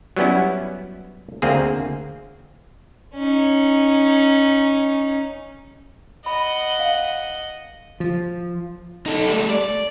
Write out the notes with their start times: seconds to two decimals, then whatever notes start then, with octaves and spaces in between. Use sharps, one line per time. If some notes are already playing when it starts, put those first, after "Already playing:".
0.16 F#3 G3 B3 C#4 E4
1.42 D2 A#3 C4 G#4
3.15 C#4 D#4
6.26 D#5 F#5 B5
6.79 F5
8.00 F3
9.06 D#4 A4
9.28 G3 A3
9.50 D5